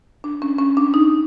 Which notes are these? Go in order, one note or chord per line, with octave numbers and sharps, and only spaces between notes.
D4
C#4
C#4
D4
D#4